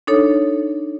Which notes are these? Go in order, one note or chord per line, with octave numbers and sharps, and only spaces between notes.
D4 D#4 A4 C#5